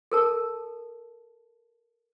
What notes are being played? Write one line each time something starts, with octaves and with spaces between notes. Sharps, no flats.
A4 A#4 A5